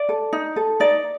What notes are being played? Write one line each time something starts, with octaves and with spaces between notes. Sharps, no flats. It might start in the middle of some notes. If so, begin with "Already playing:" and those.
Already playing: D5
A4
D#4
A4
D#4 D5